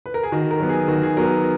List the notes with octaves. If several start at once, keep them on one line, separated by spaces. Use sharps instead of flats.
B4
A#4
G#4
D#3 F#4
A#4
F#3 B3
G#4
D#3 F#4
G#4
F#3 B3 A#4